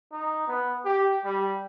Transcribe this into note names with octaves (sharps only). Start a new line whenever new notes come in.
D#4
B3
G4
G3